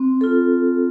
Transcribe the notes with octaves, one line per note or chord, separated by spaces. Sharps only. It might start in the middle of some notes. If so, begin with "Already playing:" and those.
Already playing: C4
F4 A4